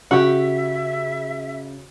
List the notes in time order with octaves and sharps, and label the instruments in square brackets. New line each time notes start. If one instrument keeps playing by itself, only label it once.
[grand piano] C#3 [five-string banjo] F#4 G4 [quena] E5